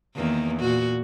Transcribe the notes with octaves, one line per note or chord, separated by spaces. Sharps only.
E2 D#3 A#3
A#2 F#4